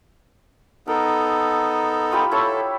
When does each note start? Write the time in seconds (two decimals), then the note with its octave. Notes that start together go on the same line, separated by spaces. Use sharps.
0.87 B3 D#4 A4 A#4
2.12 F4 G4 B5
2.31 E4 A4 C#5 A5